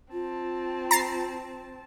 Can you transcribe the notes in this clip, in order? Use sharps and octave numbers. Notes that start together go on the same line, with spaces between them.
C4 F4 A5
A#5 A6 C7